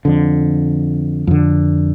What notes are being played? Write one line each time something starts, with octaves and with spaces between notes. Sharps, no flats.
F2 D3
F2 D3